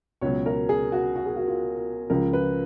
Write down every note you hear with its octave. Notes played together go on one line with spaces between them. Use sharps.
C#2 B2 F#3 C#5
A#4
G#4
F#4
F#4
G#4
F#4
F4
C#2 C#3 F3 A#4
B4